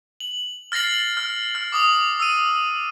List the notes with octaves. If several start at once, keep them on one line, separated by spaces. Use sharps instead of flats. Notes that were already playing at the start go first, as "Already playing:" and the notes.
F#7
F6 A6 A#6 C7 F#7
F6
F6
D6 D#6 F#7
E6 D#7